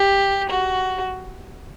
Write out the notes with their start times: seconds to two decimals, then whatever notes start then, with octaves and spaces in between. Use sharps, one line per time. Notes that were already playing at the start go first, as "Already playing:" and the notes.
Already playing: G4
0.49 F#4